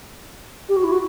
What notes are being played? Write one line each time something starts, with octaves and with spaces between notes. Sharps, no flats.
G4
F#4
E4
F#4